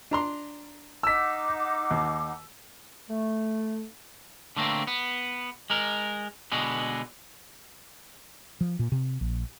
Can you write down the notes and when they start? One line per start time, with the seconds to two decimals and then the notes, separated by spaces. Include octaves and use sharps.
0.11 D4 A#5 C6
1.03 D#4 F#5 D6 E6 B6
1.91 D#2
3.09 A3
4.57 D3 A3 A#3 C4
4.87 B3
5.70 G#3 A#4
6.52 B2 D3 G#3 B3
8.61 F3
8.79 A#2
8.92 C3
9.21 A#1